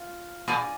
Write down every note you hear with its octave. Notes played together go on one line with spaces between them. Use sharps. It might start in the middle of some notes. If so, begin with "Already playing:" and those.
Already playing: F4 C5 F5
A#2 F4 G#4 D5